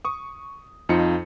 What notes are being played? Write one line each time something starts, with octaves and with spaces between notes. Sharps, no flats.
C#6 D#6
F2 F3 D#4 F4 C#7